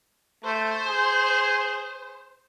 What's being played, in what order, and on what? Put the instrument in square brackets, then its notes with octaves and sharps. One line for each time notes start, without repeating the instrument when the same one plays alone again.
[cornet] A3 [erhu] C5
[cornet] G#4